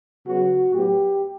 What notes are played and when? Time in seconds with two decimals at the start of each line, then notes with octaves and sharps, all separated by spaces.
0.26 C#3 F#3 B3 F#4
0.72 A2 F#3 B3 G4